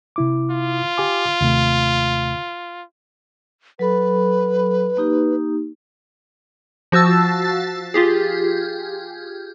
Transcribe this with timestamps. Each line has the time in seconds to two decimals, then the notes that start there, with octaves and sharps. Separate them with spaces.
0.16 C3 E4 D6
0.51 F4
0.98 G4 G#5 D6
1.41 D#2 C3 A3
3.79 F#3 A4 B4 B5
4.97 A#3 D#4 G4
6.92 F3 F#4 A5 E6 A6
7.94 F4 G4 G#4